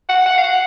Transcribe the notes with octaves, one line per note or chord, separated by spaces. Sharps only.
F#5
F#5
F5
F#5